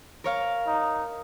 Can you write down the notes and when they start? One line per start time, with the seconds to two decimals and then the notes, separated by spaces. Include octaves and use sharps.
0.24 A#4 C#5 F5
0.67 D#4